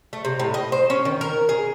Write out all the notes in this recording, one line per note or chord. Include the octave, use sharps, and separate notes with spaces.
A3
C3
A2
D#5
C5
C#4
D#3
A#4
G#4